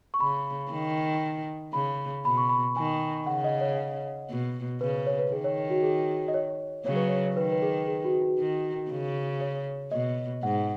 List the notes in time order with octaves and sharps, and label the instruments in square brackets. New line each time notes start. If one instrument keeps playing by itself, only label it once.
[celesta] C#6
[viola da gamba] C#3 [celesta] B5
[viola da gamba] D#3
[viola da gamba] C#3 [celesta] B5
[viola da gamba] B2 [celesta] B5
[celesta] C#6
B5
[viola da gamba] D#3 [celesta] G#5
[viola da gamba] C#3 [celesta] F#5
[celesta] D#5
C#5
[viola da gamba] B2
[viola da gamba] C#3 [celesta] B4
[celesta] C#5
B4
[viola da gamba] D#3 [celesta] G#4
[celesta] C#5
F#4
G#4
D#5
C#5
[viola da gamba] C#3 F#3 [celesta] C#5
[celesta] B4
C#5
C#5
[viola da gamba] D#3 [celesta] B4
[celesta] B4
G#4
G#4
F#4
F#4
[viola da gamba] D#3
C#3
[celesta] C#5
[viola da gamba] B2 [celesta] D#5
[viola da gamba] G#2 [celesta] F#5